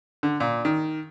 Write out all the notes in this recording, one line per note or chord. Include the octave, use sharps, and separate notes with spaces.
D3
A#2
D#3